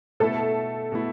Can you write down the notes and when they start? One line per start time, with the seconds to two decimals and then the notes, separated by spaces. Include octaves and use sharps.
0.20 B2 A3 E4 A4
0.92 B2 A3 E4